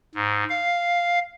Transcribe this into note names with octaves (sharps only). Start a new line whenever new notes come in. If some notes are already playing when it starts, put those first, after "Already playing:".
G#2
F5